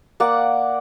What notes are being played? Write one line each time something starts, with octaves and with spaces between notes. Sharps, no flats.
A#3 D5 F#5 D6